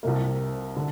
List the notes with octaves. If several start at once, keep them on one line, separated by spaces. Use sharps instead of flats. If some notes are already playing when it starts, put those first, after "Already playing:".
C2 C3 A#3
D3